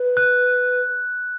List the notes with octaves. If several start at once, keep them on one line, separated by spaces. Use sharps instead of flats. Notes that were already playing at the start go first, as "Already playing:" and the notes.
Already playing: B4
F#6